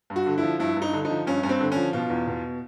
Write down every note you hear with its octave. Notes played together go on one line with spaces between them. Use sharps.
G2
F#4
D3
E4
F3
G2 E4
G2 D#4
D3
D#4
F3
G2 C#4
G2 C#4
C4
D3
F3 C#4
B2 F4
E2
B2